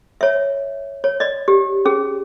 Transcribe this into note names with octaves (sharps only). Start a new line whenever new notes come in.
C#5 E5
C#5
D5 D#5
G4
C#4 G#4